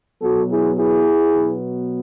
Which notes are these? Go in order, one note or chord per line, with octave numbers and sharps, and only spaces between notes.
B2 F#3 B3 F#4 A4
E4 G#4
E4 G#4
B2 F#3 B3